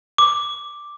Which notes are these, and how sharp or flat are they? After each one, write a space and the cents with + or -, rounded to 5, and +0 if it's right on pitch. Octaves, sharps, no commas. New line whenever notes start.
D6 +0